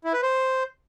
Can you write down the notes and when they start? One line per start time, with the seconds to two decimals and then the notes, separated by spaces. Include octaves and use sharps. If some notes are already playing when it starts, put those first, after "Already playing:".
0.04 E4
0.13 B4
0.22 C5